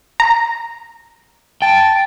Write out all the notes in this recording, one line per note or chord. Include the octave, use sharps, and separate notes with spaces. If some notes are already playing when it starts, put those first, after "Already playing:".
A#5
G5 A5